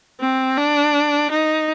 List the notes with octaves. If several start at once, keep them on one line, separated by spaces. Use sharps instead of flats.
C4
D4
D#4